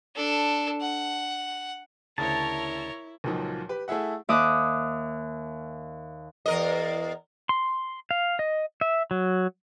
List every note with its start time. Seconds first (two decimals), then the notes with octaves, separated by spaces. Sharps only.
0.15 D4 A4
0.81 F#5
2.18 D2 C#3 E4 A#4 C#5 A5
3.24 C#2 A#2 F3 F#3 D#4
3.69 G4 B4
3.88 A3 E4 G#4 E5 F#5
4.29 D#2 E5 D6 D#6 F#6
6.46 E2 A#4 D#5
7.49 C6
8.11 F5
8.39 D#5
8.81 E5
9.11 F#3